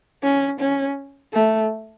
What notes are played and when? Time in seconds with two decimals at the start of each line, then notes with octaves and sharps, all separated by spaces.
0.23 C#4
0.60 C#4
1.33 A3